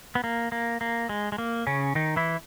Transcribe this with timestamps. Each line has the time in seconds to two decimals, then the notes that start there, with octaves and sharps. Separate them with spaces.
0.15 B3
0.24 A#3
0.52 A#3
0.81 A#3
1.09 G#3
1.32 G#3
1.38 A#3
1.67 C#3 C#4
1.95 D#3 D#4
2.16 E3 E4